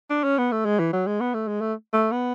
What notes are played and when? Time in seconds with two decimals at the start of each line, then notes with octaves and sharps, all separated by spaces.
0.10 D4
0.24 C#4
0.38 B3
0.52 A3
0.65 G#3
0.79 E3
0.93 F#3
1.07 G#3
1.20 B3
1.34 A3
1.48 G#3
1.61 A3
1.93 A3
2.11 B3